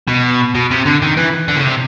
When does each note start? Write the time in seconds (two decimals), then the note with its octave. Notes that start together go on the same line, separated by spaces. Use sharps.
0.08 B2
0.55 B2
0.71 C3
0.86 D3
1.02 D#3
1.17 E3
1.48 D3
1.57 C#3
1.64 C3